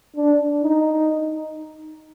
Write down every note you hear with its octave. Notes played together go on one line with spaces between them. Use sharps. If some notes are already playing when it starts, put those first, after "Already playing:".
D4
D#4